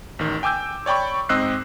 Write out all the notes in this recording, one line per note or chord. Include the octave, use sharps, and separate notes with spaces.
A1 D#3
G5 G#5 D6 E6 G6
C#5 D5 G5 B5 C#6
G#2 C4 D#5 E6 F#6 C7